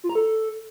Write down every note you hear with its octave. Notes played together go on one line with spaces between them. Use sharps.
F4
A#5
A4